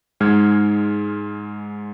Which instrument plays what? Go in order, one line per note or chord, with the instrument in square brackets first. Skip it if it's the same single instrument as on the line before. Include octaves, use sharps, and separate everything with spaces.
[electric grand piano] G#2 G#3 F6 G#6